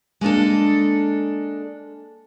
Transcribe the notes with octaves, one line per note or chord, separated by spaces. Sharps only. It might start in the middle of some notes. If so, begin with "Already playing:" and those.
G#3 A#3 D4 A4